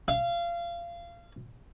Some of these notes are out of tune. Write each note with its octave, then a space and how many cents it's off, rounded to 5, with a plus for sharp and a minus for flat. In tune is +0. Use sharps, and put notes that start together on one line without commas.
F5 -25